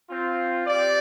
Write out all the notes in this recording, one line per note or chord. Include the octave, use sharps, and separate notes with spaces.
C4 F4
C4 G4 D5